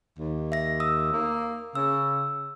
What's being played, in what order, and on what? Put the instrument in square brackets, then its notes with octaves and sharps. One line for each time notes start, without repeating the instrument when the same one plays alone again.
[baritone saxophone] D#2
[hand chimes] E5 A#6
D#6 E6
[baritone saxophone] A#3
[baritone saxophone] C#3 [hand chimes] E6